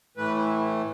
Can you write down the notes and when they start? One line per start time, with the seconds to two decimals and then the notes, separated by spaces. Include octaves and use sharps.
0.17 A2 E3 A3 B4
0.35 E4